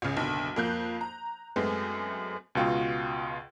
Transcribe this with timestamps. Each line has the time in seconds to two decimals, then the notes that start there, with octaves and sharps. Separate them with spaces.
0.02 C#2 C#3
0.17 F#1 B1 D3
0.56 F2 A#3 F#6 G6
1.01 A#5
1.56 F#2 G#3 A3 B3 C4
2.55 C#2 B2 F4 F#4 G5